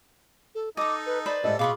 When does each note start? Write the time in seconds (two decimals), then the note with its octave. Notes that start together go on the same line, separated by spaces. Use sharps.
0.55 A4
0.77 D#4 A4 D#5 A#5 D6
1.06 B4
1.26 B4 C5 D5 B5
1.44 G#2 G3 E4 A4 D#5
1.59 B2 F4 G#4 F5 B5 C#6 D6